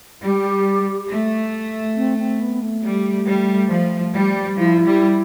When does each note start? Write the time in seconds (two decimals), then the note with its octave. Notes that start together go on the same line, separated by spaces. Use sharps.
0.22 G3 G4
1.10 A3
1.96 C4
2.18 C4
2.40 B3
2.62 A3
2.83 G3
3.27 G3
3.70 F3
4.14 G3
4.57 F3 E4
4.86 G3